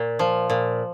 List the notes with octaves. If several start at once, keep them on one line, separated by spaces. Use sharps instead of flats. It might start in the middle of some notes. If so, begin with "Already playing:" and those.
Already playing: A#2
F3
A#2